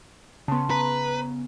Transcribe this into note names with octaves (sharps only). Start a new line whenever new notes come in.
C#3 B3 A5 C6
B4 A#5